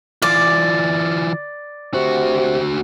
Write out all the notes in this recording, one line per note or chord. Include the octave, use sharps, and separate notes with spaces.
E3 F4 D5
D2 C3 F#4